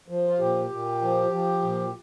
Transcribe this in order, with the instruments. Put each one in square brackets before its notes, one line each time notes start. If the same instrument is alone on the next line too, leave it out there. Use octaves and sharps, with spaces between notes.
[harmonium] F3
F4
A#2 G4
A#2
F3
F3
A#2